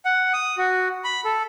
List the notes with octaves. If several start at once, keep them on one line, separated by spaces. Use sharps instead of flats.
F#5
D#6
F#4
B5
A4